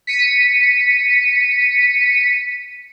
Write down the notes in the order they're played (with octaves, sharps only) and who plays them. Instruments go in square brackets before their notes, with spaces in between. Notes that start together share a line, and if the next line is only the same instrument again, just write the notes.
[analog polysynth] B6 C#7 D#7